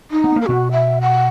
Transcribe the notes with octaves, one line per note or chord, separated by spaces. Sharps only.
D#4
B3
A#3
A#4
B2 B3 F#4
E5
F#5